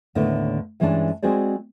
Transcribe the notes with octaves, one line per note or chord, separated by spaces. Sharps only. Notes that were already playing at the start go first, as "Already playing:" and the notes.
D#2 A2 D3 A3 B3 E4
G2 E3 G#3 C#4 D4 A5
G#3 C4 F#4 G#4 C5 D5